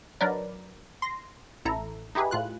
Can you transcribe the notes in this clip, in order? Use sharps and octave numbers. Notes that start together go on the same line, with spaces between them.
F#3 D4 D#4 A#4 B4 D5
C6 A#6
A1 E4 A4 A#5
D#4 E4 G4 G#4 B4
A2 F4 F#6